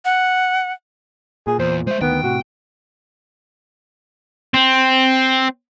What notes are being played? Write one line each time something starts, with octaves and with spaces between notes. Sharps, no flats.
F#5
A#2 G#4
E2 C5
G#3 C5 E5
D2 D#3 B3 G5
A2 C3 F#4
C4